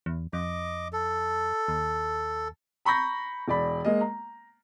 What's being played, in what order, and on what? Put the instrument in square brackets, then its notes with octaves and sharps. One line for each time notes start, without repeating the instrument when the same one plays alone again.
[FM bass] E2
[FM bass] F2 [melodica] D#5 D6
[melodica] A4
[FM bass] D#2
[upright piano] A#5 B5 C#6 G6 A#6
E1 D5 B5
G#3 A#3 D#5
A#5